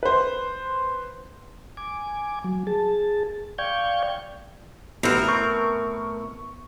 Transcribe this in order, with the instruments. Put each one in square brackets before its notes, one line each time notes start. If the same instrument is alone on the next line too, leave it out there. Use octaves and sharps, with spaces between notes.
[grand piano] B4 C5
[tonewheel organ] G#5 D6
F#3
G#4 A5
D5 F5 G5 C#6 G6 G#6
[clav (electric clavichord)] A1 C4 F#4 [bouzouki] A2 A#4 [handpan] B3 E4
[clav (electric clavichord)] C4 [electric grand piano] C#6